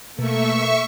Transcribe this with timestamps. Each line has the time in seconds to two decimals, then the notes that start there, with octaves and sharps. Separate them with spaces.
0.19 B2 A3 A#3 E5 C#6